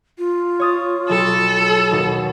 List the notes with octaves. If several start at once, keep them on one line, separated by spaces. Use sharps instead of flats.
F4
C#5 D#6 A6
B1 A4
D#2 B2